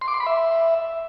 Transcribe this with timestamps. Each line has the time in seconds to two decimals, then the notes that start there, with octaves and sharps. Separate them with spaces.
0.01 C6
0.08 D6
0.14 C6
0.20 B5
0.27 E5